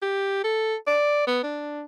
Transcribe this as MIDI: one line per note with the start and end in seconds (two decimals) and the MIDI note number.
0.02 0.43 67
0.44 0.75 69
0.87 1.24 74
1.27 1.43 59
1.44 1.84 62